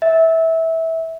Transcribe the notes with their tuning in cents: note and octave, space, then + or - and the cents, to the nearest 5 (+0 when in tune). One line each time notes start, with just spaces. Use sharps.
E5 -20